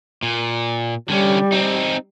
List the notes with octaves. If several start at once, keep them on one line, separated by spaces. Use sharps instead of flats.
A#2
D3 G3 C#4
C4 D#4